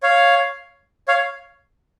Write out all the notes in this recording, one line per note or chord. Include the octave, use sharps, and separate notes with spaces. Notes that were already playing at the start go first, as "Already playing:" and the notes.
C#5 F5
C#5 F5